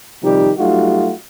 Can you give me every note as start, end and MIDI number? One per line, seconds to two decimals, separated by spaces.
0.23 0.51 48
0.23 0.51 51
0.23 0.51 53
0.23 0.51 55
0.23 0.51 63
0.23 0.51 67
0.58 1.12 54
0.58 1.12 55
0.58 1.12 57
0.58 1.12 63
0.58 1.12 65
0.58 1.12 66